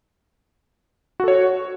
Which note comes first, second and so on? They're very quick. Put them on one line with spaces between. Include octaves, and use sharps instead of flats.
F#4 A4 C#5